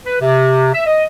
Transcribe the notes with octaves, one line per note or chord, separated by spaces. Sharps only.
B4
C3
E5
D#5